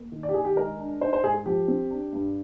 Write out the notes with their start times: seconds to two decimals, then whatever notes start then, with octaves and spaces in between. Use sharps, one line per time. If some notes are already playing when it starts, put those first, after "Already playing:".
Already playing: A#3
0.12 D#3
0.23 D5
0.29 G4
0.34 D#3 G#4
0.45 G4
0.56 G#3 A#4
0.79 D4
1.01 D#4 C5
1.13 C5
1.23 G#2 G#4
1.34 G#4
1.46 F3 G4
1.68 C4
1.91 D4
2.13 G2